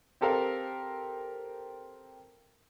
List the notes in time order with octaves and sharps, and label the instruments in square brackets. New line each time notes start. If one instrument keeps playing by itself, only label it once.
[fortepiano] C4 G4 A4 A#4 F5